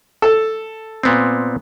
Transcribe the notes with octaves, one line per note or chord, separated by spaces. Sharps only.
A4
A#2 B3 C4